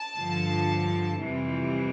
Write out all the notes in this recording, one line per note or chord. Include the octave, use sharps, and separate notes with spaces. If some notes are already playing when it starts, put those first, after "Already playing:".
Already playing: A5
G2 D3 F3
F2 C3 E3 G3